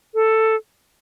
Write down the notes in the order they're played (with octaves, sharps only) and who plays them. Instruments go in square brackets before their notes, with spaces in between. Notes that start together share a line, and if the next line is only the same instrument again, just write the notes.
[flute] A4